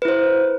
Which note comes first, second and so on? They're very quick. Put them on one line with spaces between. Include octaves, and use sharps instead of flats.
B4 E4 C5